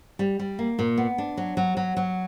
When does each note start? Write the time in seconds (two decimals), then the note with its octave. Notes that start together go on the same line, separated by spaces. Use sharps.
0.19 G3
0.39 G3
0.59 A#3
0.79 A#2
0.97 B3
1.18 D4
1.37 F#3
1.57 F#3
1.77 F#3
1.97 F#3